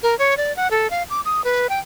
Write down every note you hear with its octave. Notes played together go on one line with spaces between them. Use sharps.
A#4
C#5
D5
F#5
A4
F5
D6
D#6
B4
G5